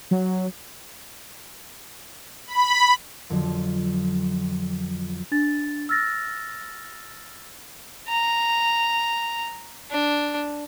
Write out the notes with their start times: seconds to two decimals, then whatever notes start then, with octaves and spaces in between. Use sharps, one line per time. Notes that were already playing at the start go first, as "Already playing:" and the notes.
0.11 F#3
2.47 B5
3.30 F2 D3 F#3
5.32 D4 A6
5.89 E6 F6 A6 A#6
8.09 A#5
9.91 D4